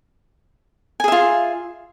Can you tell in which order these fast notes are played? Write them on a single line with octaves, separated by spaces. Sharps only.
G#5 G#4 E5 F4